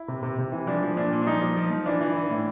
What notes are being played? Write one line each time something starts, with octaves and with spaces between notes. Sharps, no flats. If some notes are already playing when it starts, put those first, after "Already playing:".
Already playing: E4
C3
C3
C3
E3
F3 D4
F3
A#2 D4
A#2
D4
F3 D#4
F3
F3
F3
E3 D4
E3
E3
A2